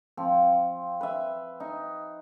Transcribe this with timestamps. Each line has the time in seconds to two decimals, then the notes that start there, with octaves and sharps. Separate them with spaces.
0.17 F3 C4
1.01 B4 E5
1.60 D#4